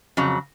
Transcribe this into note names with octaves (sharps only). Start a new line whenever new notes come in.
F2 C#3 F#3